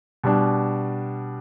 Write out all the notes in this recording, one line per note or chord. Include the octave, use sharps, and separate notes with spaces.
B2 G3 D4